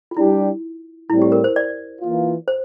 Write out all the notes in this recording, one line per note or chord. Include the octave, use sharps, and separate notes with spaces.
F4
G3 D4 E4 G4
A2 G3 C4 E4
G4
A#4
C5
D5
E3 A#3 F4
C5